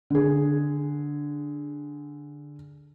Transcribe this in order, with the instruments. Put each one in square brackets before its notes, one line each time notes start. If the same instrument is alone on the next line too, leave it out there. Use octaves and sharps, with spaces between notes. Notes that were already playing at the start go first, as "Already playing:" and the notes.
[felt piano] D3 G#4